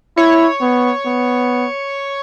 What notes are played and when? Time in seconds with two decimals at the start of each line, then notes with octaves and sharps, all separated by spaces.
0.17 E4 C#5
0.61 B3
1.06 B3